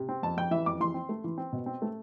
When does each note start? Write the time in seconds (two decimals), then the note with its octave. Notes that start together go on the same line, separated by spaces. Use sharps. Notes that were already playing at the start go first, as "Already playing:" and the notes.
Already playing: C3
0.09 C4
0.23 F2 A5
0.37 F2 G5
0.51 E3 E5
0.66 F2 D6
0.80 E3 C6
0.94 C4
1.09 A3
1.24 E3
1.38 C4
1.53 B2
1.66 C4
1.82 A3